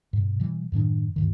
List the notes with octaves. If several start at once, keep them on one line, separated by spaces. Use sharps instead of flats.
G2 B2
B2 E3 G3
F#2 A2 D#3 D4
D2 G2 D#3